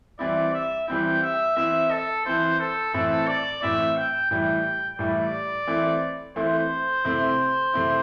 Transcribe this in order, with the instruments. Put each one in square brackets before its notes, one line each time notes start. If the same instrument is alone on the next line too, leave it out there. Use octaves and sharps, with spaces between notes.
[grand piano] E3 G3 C4 E4 [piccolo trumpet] D5
[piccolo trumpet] E5
[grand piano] E3 G3 C4 E4 [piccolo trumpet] G5
[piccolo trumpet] E5
[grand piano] E3 C4 E4 [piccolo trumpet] E5
[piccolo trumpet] A4
[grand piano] E3 C4 E4 [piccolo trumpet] C5
[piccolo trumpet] A4
[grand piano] A2 E3 C4 E4 [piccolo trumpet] A4
[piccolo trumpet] D5
[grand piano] A2 E3 C4 E4 [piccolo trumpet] E5
[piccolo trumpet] G5
[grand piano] A2 E3 G3 E4 [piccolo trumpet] G5
[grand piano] A2 E3 G3 E4 [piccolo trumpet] D5
[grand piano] E3 A3 C4 E4
[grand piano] E3 A3 C4 E4 [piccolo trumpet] C5
[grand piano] C3 A3 C4 E4
C3 A3 C4 E4